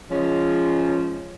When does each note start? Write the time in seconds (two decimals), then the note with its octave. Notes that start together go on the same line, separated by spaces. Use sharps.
0.10 F3 G#3 C#4